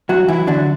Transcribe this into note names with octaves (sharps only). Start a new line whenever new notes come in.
G2 F#3 F#4
E3 F#3 E4
D3 F#3 D4